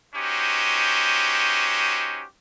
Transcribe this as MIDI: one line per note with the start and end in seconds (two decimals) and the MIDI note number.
0.15 2.25 61
0.15 2.25 63
0.15 2.25 66
0.15 2.25 67
0.15 2.25 72